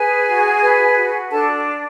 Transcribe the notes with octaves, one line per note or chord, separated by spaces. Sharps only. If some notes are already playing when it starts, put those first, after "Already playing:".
Already playing: G#4 B4 G#5
F#4
B4
F#4
D4 A4 A5